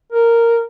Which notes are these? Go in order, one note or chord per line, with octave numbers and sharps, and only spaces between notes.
A#4